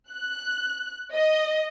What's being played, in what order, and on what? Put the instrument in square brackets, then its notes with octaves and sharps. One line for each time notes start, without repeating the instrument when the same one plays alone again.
[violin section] F#6
D#5